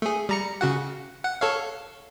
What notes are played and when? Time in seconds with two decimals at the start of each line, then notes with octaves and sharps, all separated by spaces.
0.02 A3 G#4
0.29 G3 A#5 C#7
0.61 C#3 F#4 F#5
1.24 F#5
1.41 A4 C#5 F5